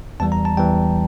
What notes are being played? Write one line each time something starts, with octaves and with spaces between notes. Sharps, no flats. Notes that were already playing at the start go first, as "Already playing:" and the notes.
E2 E3 G3 A5
A#5
A5
E2 E3 G3 G5